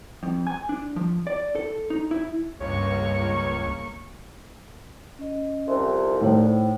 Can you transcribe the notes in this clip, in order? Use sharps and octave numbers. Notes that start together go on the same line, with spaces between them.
F2
G#5
D4
F3
D5
A4
D#4
E4
C#2 G2 A#3 C#5 C#6
C#4 D#5
C2 F2 E5 C6
A2 D#4 C5